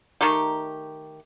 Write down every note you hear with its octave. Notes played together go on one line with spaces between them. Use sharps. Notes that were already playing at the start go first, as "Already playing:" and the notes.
D#3 A3 D#4 G4